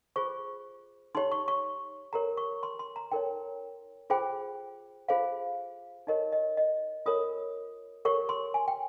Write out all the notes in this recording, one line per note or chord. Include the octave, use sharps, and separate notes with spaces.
F4 G#4 C5 C#6
D#4 G4 C#5 C6
C#6
C#6
G4 A#4 C#5 A#5
C#6
C6
C6
A#5
D#4 A#4 C#5 G5
F4 G#4 C5 G5
F4 G#4 C5 F5
D#4 G4 A#4 C#5 D#5
D#5
D#5
F4 A#4 C#5 D#6
G4 A#4 C#5 C#6
C6
G#5
G5